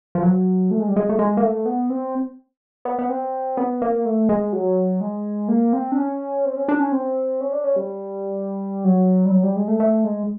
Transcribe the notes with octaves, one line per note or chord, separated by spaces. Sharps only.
F3
F#3
A3
G#3
G3
G#3
A3
G#3
A#3
A3
B3
C4
B3
B3
C4
B3
A#3
A3
G#3
F#3
G#3
A#3
C4
D4
C#4
C4
C#4
D4
C#4
C4
C#4
D4
C#4
G3
F#3
G3
F#3
G3
G#3
A3
A3
G#3